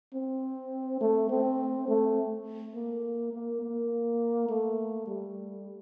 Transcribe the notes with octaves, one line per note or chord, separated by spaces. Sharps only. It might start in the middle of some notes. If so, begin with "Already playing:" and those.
C4
A3
C4
A3
A#3
A#3
A#3
A3
G3